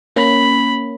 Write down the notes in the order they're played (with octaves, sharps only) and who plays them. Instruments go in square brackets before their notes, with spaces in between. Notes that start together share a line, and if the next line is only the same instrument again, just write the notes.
[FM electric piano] A#3 C#4 [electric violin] B5